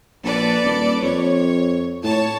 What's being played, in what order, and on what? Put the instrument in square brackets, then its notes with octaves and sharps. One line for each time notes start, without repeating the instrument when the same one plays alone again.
[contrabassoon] A#1 [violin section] A4 B4 D5
[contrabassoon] D#1
[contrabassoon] F2 [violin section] C#5
[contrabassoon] A2 [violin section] C#5 A5